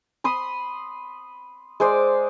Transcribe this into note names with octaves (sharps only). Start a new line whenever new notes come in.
B5 C6 D#6
G#3 C5 D5